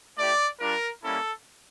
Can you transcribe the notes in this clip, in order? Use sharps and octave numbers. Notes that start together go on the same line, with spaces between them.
A3 E4 G4 D5
G3 D4 F4 A#4
G3 A#3 C#4 E4 A4